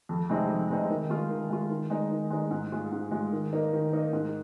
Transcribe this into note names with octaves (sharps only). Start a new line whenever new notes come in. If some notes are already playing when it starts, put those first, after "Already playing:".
F2
C3 G#3 C4 D#4
F2
C3 G#3 C4 D#4
D#3
G#3 F4
D#3
G#3 F4
D#3
G#3 D#4
D#3
G#3 D#4
G#2
G#3 F4
G#2
G#3 F4
D#3
A#3 D#4
D#3
A#3 D#4
G#2